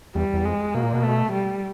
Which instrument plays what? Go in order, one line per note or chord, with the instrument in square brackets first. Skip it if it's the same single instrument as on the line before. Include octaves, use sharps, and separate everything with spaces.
[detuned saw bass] E2 [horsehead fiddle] G3
[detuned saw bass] E2
[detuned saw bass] F2 [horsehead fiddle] G#3
[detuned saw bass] B2 [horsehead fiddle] A#3
[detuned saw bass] A#2
B2
[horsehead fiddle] A3
G3